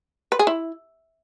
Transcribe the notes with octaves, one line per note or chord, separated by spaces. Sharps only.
B4
G#4
E4